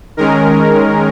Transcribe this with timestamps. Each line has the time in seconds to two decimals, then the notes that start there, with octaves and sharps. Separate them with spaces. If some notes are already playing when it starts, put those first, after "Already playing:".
0.17 D#3 G#3 C#4 A#4